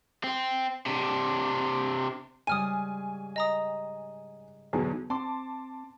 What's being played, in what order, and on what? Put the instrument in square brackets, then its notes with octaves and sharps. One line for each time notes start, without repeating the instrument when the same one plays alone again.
[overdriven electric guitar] C4
C3 D4
[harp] G#2 C#3 G3 [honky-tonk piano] G#5 [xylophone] D#6 F6 D#7
[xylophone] D#5 A#5 D#6
[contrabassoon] B1 [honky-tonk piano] E2 G#4 [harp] B2 D3
[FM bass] C4 [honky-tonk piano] A5 C6 D6